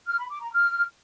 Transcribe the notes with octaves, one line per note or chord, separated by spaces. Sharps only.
F6
B5
D6
A#5
F6